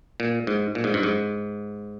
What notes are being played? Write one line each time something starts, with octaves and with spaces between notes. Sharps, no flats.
A#2
G#2
A#2
G#2
G2
G#2